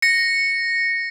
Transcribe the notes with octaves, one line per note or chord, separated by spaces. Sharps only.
A#6 C#7